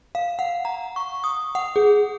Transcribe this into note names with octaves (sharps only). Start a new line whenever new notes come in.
F5
F#5
A#5
C#6
D#6
F#5
G#4